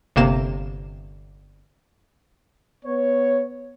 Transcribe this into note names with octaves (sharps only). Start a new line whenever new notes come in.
G1 C3 A#3 E7
B3 C#5